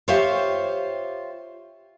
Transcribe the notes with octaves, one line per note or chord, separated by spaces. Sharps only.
F4 G4 C5 C#5 E5 F5